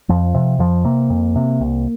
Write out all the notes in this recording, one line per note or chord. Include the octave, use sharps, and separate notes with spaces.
F2 F3
C3
F2 F3
C3 A#3
F2
C3
C2